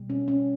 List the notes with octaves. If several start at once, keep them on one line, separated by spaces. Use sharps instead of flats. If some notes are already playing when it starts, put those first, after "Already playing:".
Already playing: B2 G3
C#4
C#4